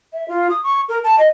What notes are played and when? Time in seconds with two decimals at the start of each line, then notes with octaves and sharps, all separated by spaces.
0.13 E5
0.28 F4
0.50 D#6
0.63 C#6
0.89 A#4
1.04 A5
1.18 D#5